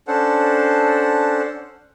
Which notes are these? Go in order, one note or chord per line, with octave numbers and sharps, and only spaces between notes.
C#4 D4 A4 C5 F#5